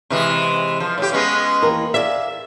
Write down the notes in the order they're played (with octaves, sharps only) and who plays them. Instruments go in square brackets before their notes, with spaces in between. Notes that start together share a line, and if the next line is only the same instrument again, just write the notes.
[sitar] C3 E3 G#3
F3
A2 G4
G#3 B3 C#4
[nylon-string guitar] D#2 E3 A#4
[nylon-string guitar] G#4 D5 F5 [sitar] E5